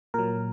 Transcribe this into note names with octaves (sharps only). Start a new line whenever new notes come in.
A#2 F#3 A#4